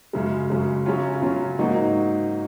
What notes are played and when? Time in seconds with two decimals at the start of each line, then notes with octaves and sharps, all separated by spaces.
0.13 F#2 C#3 G#3
0.50 F#2 C#3 G#3
0.86 C#3 F#3 C#4 F4
1.22 C#3 F#3 C#4 F4
1.59 G#2 F#3 A#3 D#4 F#4